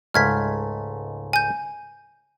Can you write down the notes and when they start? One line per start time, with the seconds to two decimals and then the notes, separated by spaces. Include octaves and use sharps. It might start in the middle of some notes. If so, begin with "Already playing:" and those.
0.14 C#2 G#2 A3 F6 G#6 B6
1.33 G#5 G6